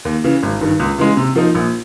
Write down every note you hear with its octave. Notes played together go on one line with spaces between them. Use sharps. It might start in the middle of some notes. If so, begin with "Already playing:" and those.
D#2
C#3 E3
G#1
G2 D#3
C#2
C#3 E3 G#3
C3
F3 A#3 D#4
A#1